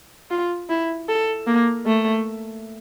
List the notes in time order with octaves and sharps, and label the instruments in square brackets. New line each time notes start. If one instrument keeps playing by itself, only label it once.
[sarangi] F4
E4
A4
A#3
A3